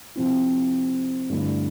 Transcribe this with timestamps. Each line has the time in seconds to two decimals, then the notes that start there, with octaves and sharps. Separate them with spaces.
0.16 C3 F3 C4 E4
1.30 G2 D3 A3 E4